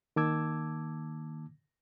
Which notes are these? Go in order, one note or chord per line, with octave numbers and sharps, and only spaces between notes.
D#3 A#3 A5 D6 E6 G#6